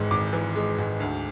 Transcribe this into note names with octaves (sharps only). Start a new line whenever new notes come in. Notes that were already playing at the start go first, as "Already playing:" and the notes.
Already playing: G#1 G#2 E3 G#3
G#1 D6
E3
G#3
G#2
D2